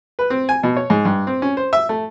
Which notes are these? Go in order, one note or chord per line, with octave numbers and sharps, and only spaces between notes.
B4
C4
G#5
B2
C#5
G#2
G2
C4
C#4
C5
E5
A3